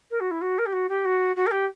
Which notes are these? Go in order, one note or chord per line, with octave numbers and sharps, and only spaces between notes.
A#4
F#4
E4
F#4
A#4
G4
F#4
G4
F#4
F#4
A#4
G4